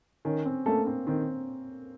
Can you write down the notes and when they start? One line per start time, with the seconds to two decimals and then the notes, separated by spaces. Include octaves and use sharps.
0.25 D#3 C#4
0.45 C4
0.66 A3 A#3 C#4 A4
0.87 C4
1.07 D#3 C4